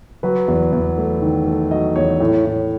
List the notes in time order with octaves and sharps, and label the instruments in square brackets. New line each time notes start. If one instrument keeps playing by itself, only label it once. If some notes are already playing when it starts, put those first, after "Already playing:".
[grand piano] F#3 B4
E2
E2
A3
D#3
A3
F#3 D#5
E2 C#5
A2
A2